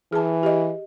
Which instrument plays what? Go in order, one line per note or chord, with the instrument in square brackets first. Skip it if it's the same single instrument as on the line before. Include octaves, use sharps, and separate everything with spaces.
[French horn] E3 [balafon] G#4 A5
[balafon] G4 D#5